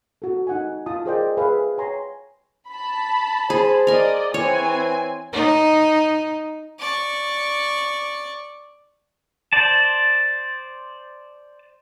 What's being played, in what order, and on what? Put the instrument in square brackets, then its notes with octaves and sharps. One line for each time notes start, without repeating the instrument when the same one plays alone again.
[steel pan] F#4 A4
D#4 F#5 G#5
F4 A5 D#6
G#4 A#4 C5 D5 D#5 G5
G#4 B4 E5 F5
C#5 G5 G#5 A#5 C6
[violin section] A5 B5
[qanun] G#4 [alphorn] C5
[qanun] A#4 G#5 [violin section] D5 D#5
[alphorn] E3 [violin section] C4 G#5 [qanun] C#5
[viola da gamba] D#4
[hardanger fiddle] D5 C#6
[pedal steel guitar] C5 D5 A5